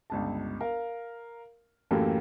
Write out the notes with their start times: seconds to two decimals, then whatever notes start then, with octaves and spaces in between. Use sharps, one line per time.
0.10 G1 C#2 A5
0.61 A#4 F5
1.91 F#2 A2 E3 A#3 G4 A4